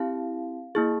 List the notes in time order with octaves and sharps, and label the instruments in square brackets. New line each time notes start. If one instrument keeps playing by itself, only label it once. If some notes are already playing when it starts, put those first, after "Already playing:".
Already playing: [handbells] C4 E4 G4 F5
A#3 E4 G#4